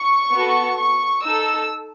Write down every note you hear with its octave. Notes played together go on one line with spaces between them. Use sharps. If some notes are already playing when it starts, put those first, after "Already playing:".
Already playing: C#6
B3 F#4 A4
C#6
D#4 A4 E6